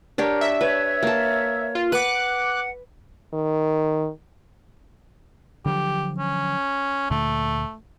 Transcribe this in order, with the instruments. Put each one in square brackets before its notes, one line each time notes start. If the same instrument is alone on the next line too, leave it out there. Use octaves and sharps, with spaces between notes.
[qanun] D4 G4 C#5 [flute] A#4
[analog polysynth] E5
[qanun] B4 [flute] C#5
[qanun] A#3 A5
[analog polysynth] F4
[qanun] B4 [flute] F#5 [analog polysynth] D6 F#6
[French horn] D#3
[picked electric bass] D3 F3 F#3 [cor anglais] G4
[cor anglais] C#4
[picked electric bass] D2 A#2 D3 [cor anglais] A3